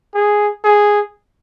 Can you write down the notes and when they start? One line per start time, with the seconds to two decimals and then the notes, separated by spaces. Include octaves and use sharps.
0.14 G#4
0.65 G#4